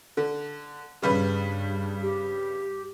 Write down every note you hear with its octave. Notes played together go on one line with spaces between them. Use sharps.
D3
G2 C#3 G3 B4
G4